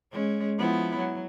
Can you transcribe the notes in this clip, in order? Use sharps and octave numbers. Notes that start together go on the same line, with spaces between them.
G#3 C#4
F3 B3 E4
F#3